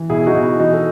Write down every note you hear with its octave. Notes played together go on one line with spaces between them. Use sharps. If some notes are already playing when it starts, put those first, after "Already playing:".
Already playing: E3
B2 E4 G#4
D#4 F#4
B2
E4
E3 D#4 F#4
A4